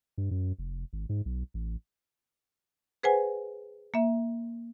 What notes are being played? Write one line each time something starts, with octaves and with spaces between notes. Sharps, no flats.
G2
F#2
F1
G#1
G#2
B1
A1
G#4 B4 C5 F#5 G#5
A#3 E5